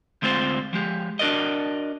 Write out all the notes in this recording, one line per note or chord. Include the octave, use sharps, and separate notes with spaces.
D2 G#3 C4 F4 C5
F3 G#3 G4
D4 F#4 A#4 D5 D#5